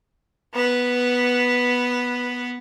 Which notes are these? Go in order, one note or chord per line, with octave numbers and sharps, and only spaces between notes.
B3 B4